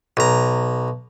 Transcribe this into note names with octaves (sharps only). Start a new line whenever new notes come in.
B1 A#5